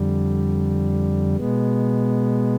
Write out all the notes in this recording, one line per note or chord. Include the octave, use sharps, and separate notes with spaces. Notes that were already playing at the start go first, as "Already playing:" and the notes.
Already playing: F2 D3 G3
B2 G#3 B3